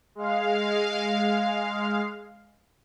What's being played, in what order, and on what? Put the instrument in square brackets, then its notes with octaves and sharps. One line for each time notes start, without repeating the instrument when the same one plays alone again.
[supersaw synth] G#3 F5